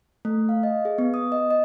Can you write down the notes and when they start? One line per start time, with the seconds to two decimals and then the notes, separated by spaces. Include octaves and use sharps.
0.25 A3
0.49 F5
0.63 D#5
0.85 G#4
0.98 B3
1.14 D#6
1.32 D#5
1.51 D#5